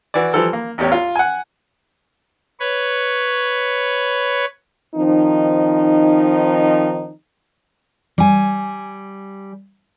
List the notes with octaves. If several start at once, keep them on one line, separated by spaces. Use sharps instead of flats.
E3 F#4 D5
E3 F3 G3 A4 E6
A#3
A1 E2 G4 C#5
F4
F#5 G#5
B4 C#5
D#3 F3 C4 D#4
G3 G#5